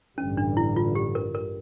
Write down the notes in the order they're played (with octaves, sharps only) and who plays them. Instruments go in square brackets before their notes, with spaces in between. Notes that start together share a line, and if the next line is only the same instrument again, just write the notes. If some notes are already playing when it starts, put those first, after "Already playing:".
[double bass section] A1 G2 D3 G3 [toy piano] C#4
[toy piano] D4
E4
F4
G4
A#4
A#4